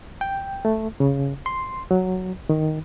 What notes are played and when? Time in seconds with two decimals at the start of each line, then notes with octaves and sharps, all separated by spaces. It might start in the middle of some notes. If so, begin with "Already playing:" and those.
0.21 G5
0.65 A3
1.00 C#3
1.46 C6
1.91 F#3
2.50 D#3